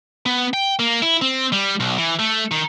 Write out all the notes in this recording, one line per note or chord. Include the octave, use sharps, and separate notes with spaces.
B3
G5
A#3
E4
C4
G3
B1
E3
A3
D#3